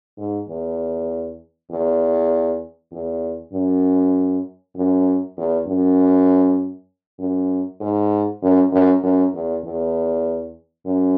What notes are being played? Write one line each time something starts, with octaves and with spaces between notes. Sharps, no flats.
G#2
E2
E2
E2
F#2
F#2
E2
F#2
F#2
G#2
F#2
F#2
F#2
E2
E2
F#2